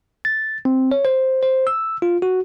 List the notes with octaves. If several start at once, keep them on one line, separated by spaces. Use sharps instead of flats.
A6
C4
C#5
C5
C5
E6
F4
F#4